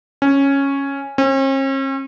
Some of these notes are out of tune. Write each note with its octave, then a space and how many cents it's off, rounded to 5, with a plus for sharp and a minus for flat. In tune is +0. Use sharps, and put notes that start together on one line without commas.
C#4 -5
C#4 -45